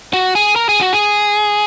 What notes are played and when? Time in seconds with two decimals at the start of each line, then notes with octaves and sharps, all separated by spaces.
0.13 F#4
0.35 G#4
0.56 A#4
0.69 G#4
0.81 F#4
0.93 G#4